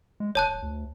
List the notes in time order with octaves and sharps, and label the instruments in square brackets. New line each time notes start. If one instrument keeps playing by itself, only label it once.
[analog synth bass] G#3
[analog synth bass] F1 [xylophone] C#5 A5 F#6
[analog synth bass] D1
D2